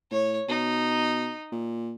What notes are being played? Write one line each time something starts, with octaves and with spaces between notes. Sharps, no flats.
A2 C#5
B2 D#4
A#2